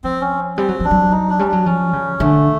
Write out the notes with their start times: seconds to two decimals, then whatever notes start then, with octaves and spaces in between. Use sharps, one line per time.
0.04 F3 C4
0.21 C#4
0.57 G3 C4
0.69 F#3
0.80 F3 D4
0.91 F#3
1.12 D#4
1.29 D4
1.39 G3 C#4
1.47 D4
1.53 F#3
1.66 F3 C#4
1.93 C#3
2.20 D3 A3